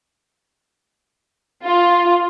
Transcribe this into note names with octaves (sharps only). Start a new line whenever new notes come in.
F4